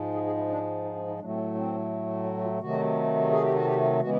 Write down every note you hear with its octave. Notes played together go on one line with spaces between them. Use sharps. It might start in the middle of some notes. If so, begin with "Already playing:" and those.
Already playing: G#2 F3 G#3
G#4
G#4
E4
D4
D#4
D4
D#4
A2 F#3 A3 D4
C4
C#4
C4
C#4
F#4
F4
C3 D#3 F#3 A3 F#4
G#4
G4
F#4
G4
C#3 E3 G#3 B3 F#4